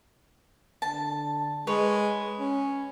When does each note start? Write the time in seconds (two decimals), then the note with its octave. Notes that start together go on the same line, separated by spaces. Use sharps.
0.82 D3 A5
1.67 G#3 B4 C#5
2.38 C#4